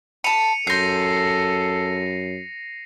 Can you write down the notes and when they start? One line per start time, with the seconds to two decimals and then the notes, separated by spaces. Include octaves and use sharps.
0.24 A5 B5 C#7 D#7 F7
0.67 F#2 A4 C6 G6 A#6 C7